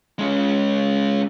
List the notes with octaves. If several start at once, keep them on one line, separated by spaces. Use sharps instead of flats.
G#3 C#4